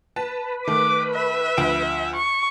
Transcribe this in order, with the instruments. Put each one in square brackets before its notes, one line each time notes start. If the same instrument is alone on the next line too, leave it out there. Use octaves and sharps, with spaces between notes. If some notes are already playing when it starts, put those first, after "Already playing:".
[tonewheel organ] B4 [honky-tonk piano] A5
[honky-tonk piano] D#3 A3 [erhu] D6
[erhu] E5
[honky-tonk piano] D2 F3 D7
[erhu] C#6